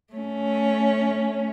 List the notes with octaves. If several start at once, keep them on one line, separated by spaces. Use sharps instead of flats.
A3 C#4